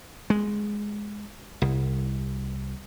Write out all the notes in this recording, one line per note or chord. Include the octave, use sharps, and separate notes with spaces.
G#3
C2